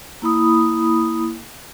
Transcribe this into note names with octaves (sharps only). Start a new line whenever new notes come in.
A#3 E4 B5 D#6